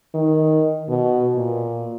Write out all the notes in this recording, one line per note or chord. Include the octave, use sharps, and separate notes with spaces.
D#3
B2
A#2